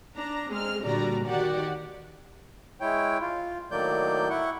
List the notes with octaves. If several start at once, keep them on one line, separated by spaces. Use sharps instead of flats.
D4 A#5
G#3 C4 F6
A#2 D3 G3 F#4 D5 A#5
D#3 F#4 G4 D5 F#5
G#3 E4 C#5 G5
F4
A2 D#3 F#3 A#3 D5 G6
E4 F#5 C#6